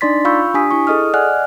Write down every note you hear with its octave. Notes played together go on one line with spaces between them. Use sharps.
D4 D#4 D5 C6 A6 B6
F4 F5 B5 C#6 E6 G6
D4 G4 G#5 D#6 B6
E4 C#6
G#4 A4 D#5 D#6 F6
D5 D#5 F#5 G#5 F6 F#6